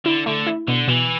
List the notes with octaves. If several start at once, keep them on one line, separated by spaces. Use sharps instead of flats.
D3 E4
D3 A3
E4
B2 D3
B2 E3